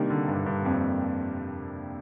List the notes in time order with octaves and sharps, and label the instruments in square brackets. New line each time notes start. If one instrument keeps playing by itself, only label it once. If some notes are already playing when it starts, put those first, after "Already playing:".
Already playing: [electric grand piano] C3 G3 A#3 D4 [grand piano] D#3
[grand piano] D3
G2
G2
F2